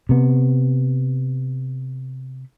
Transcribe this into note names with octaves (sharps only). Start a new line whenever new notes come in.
C3 B3